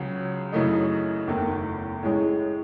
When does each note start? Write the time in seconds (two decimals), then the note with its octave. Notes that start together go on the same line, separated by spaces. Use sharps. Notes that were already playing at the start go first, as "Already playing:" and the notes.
Already playing: C#2 C#3 F#3 C#4 G#4
0.52 F#2 C#3 E3 A3 D#4
1.27 F#1 E2 D#3 A3
2.03 A2 E3 G#3 C#4 G#4